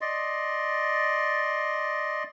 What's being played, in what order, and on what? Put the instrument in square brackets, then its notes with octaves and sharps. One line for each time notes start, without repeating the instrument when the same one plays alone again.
[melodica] D5 D#5 C6